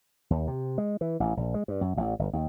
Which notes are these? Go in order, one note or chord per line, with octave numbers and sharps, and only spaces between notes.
D#2
C3
G#3
E3
A1
A#1
G#3
G2
F#2
A1
G1
D#2